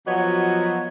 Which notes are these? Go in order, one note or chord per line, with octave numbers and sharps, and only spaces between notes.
F3 F#3 B3 F#4 C#5 D#5